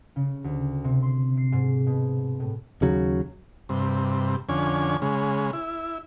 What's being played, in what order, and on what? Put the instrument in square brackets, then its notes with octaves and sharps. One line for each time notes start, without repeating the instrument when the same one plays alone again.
[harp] C#3
D2
C3
C6
C7
G#2
B2
A2
[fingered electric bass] D#2 C#3 F#3
[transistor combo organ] G2 C3
F2 D3 C#4 G#5
C#3 G#3
E4